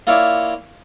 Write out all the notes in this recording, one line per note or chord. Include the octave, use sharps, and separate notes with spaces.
A#3 E4 F4 C#5 D5 E5